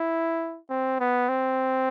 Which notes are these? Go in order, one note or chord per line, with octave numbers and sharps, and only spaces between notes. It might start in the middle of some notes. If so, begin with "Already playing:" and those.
Already playing: E4
C4
B3
C4